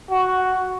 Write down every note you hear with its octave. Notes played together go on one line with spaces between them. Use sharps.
F#4